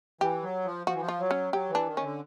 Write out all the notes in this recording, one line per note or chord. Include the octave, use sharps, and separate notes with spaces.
E3 G4
F#3
F3
F3 F#4
E3
F3
F4
F#3
C#4
F#3 G4
E3 D4
D#3
C#4
D3